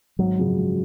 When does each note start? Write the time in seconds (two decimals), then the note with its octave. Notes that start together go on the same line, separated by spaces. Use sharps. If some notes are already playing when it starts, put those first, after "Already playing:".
0.19 G#1 F#3
0.38 F#2 C#3 F3 G#3
0.57 G#1